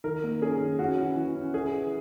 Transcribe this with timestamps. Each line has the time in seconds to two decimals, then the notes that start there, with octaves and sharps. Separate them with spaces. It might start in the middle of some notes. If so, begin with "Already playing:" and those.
0.04 D#3 A#4
0.24 A#3
0.41 C#4 G#4
0.61 D#3
0.79 C#4 F#4
0.98 E3
1.16 E3
1.36 C#4
1.54 E3 G#4
1.72 E3